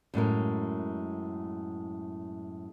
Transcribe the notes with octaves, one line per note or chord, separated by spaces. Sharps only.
F#2 A2 G#3 A#4